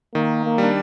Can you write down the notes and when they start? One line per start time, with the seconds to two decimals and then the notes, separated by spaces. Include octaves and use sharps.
0.14 D#3 A#3
0.44 A#3
0.58 G3 D4